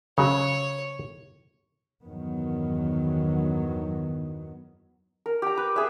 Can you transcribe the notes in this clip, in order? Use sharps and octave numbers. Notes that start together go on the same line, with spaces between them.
C#3 F#3 C#5
E2 G2 D#3 F#3 B3
A#4
G4 A#5
B4
B3 G#4 E5